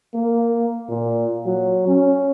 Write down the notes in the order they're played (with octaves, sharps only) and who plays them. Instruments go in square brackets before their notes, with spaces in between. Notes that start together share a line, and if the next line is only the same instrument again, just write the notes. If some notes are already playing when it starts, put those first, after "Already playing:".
[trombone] A#3
A#2
F#3
C#4